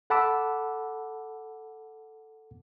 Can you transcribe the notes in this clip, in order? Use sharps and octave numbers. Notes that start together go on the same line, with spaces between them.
A4 F#5 A5 B5 D6 E6